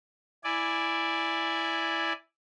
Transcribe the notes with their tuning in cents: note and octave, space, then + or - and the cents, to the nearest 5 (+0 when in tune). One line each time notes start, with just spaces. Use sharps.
E4 +0 D5 +0 G#5 +0